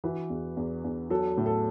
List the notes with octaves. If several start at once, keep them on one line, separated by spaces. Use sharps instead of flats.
E3 F#4 B4
E2
E2
E2
F#3 A4
A2
A4